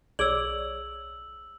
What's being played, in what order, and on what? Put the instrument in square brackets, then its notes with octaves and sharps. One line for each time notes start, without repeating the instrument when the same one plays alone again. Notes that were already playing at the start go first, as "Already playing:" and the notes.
[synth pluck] B1 C#5 [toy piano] G#4 D5 [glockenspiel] E6 F#7